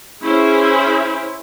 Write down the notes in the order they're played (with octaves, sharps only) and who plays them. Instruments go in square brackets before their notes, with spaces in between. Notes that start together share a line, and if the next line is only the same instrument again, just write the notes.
[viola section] C#4 E4 G#4 C5